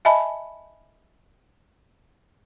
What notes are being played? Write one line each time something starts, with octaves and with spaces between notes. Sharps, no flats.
D#5 E5 G#5 A5 B5